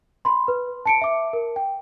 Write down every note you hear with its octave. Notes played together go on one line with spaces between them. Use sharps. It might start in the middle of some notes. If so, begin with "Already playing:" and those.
B5 C6
B4
A5 C#7 D7
E5 D6
A#4
G5